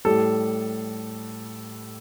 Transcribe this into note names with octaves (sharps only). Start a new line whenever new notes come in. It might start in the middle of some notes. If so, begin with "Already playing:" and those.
A2 G3 A4